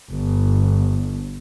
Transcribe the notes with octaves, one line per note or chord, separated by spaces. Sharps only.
G1